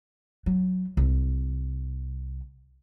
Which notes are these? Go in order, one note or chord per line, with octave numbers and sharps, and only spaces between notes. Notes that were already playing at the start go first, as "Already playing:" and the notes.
F#3
C2